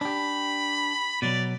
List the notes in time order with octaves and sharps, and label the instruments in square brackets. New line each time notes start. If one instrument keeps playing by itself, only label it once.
[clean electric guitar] D4 G4 [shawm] B5
[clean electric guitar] B2 F#3 [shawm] D5